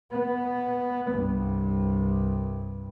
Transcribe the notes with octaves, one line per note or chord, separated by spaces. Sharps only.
B3
C2 G2